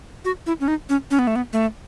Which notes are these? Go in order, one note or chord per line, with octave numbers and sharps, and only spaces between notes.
F#4
E4
C#4
D#4
C#4
C#4
B3
A3
B3
A3